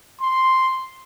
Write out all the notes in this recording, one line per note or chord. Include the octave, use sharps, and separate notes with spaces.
C6